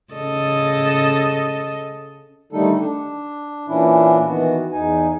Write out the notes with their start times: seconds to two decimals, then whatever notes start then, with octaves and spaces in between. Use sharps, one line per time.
0.13 C#3 A4 D#5
2.52 D3 D#3 G3 A3 D#4 A4
2.79 D4
3.68 A#2 E3 C#4 D4 E4
4.26 D#3 E3 B3 F#4
4.72 E2 D#4 G#5